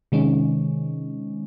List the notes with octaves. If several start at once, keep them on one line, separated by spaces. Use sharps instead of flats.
C3 D#3 G#3 C#4